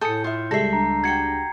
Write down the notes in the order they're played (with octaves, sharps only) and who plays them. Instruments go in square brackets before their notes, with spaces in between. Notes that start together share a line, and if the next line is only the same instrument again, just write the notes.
[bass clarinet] A2 [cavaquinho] A4 G#5 D#6 [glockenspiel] G6 C#7
[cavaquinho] F4 E5
[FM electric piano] C#2 G3 G#3 [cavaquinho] A4 E5 [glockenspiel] A#6 C7
[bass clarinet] D4 [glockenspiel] A#5
[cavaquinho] F#4 G5 [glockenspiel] G#6 C#7